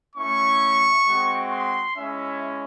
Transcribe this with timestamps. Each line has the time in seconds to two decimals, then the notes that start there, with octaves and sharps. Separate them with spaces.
0.16 A3 C#4 E4 C#6
1.06 G#3 C4 F#4
1.52 C6
1.97 G#3 C#4 E4 E5